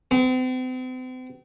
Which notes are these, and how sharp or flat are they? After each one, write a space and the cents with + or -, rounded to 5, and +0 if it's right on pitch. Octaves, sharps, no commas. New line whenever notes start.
C4 -40